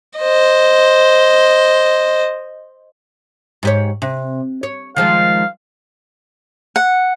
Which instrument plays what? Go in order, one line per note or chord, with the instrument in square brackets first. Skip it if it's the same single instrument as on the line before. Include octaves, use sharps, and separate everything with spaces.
[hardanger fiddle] C5 D#5
[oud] G#2 G4 C#5
C3
C#5
[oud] D#3 F3 G#3 [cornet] F5
[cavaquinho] F#5